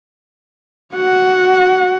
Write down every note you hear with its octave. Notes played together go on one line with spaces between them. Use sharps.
F#4 F#5